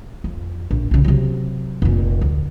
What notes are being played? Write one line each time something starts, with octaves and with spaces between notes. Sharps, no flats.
F2
A#1
B1 C#3
C3 F#3
F1 A#2
D2